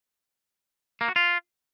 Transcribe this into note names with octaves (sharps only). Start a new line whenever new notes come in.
A#3
F#4
F4